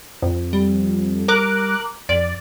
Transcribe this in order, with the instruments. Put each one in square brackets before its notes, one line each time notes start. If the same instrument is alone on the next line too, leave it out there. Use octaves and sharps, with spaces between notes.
[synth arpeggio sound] F2
[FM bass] G3
[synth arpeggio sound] A#4 D6 F#6
[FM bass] F2 [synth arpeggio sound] D5